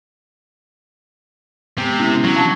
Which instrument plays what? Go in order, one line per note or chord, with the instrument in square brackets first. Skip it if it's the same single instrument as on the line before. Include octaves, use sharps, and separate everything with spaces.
[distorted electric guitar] C3 C4 [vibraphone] G#3 B3
[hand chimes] A#3 C#4 E4
[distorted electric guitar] F#3
[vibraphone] D4 [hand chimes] F5 A5 C#6